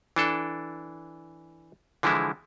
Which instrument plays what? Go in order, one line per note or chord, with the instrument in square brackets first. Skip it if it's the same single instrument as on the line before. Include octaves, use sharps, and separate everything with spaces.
[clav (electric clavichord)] E3 D4 A4
D3 E3 F3 G#3 E4